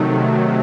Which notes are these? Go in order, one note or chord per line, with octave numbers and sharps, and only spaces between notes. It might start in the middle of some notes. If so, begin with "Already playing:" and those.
Already playing: C3 D#3 F#3 A3